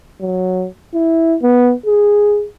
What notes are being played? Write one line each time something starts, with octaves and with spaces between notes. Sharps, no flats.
F#3
E4
B3
G#4